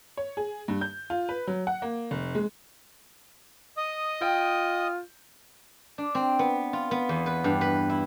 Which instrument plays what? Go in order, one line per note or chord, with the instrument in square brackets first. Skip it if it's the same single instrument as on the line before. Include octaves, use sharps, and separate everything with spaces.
[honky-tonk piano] C#5
G#4
G2
G6
F4
B4
F#3
F#5
A#3
F1
G#3
[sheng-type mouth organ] D#5 D#6
[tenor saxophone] F4 [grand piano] G5
[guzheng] D4
C4
B3
F4
B3
E2
B4
G2
B4
E4